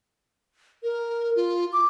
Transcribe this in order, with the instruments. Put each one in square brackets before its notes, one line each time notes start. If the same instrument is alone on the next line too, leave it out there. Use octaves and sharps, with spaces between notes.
[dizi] A#4
F4
D6